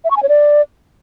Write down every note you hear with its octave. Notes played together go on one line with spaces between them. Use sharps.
E5
C#6
G#5
C#5
D5